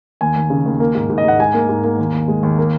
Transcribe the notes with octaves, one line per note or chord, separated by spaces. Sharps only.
D#2 G#5
D#2
C#3
D#2
A#3
G#2
G#2
D#5
G#2 F#5
G#2 G#5
A#3
G#2
A#3
D#2
D#2
G#3
D#2
A#3